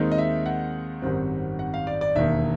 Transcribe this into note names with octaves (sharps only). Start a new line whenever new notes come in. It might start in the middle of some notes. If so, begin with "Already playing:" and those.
Already playing: D#2 D#3 G#3 C4 D#4
D#5
E5
F#5
G#1 F#2 D#3 G3 C4
F#5
F5
D5
D5
E1 D#2 D#3 E5